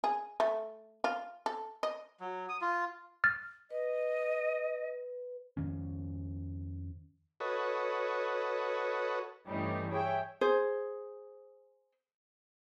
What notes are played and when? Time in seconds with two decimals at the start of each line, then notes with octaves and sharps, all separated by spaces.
0.04 G#4
0.40 A3
1.04 F4
1.46 A4
1.83 D#5
2.20 F#3
2.49 D#6
2.61 F4
3.24 F6 A6
3.71 B4 D#5
5.57 F2 D#3 C#4
7.40 F#4 A4 B4 C#5 D#5
9.47 G2 E3 G3 A3 C#4 D#4
9.91 G#4 C#5 E5 G5
10.41 G#4 C5